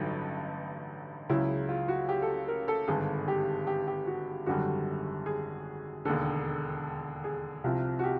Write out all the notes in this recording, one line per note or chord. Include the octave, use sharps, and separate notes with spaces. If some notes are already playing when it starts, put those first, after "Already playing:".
Already playing: A1 G2 D3 F#3 D#4
C#2 C#3 F#3 E4
F4
F#4
G4
A4
A#4
A4
G#1 G2 D3 G#4
G4
G4
G4
F#4
G#1 F#2 D3 G3 F#4
G#4
E1 D#2 D3 A4
G#4
C2 C3 F3
F#4
G4